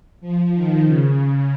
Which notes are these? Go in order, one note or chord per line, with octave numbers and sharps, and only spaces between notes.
F3
D#3
C#3